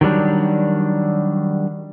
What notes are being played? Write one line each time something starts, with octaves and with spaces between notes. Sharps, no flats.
D#3 F#3 G3 D4